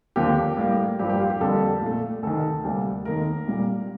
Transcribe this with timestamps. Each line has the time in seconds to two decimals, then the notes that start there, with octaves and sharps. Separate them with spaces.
0.16 D#2 D3 F3 A#3 G4
0.57 A2 G3 A#3
0.99 G2 F3 A#3 G4
1.10 G4
1.20 F4
1.30 G4
1.40 F2 D3 G3 A#3 A4
1.82 A#2 A3
2.23 D2 C3 D#3 A4
2.64 D2 C3 G3 A#3
3.05 D#2 D#3 A3 A#4
3.47 C2 A#2 G3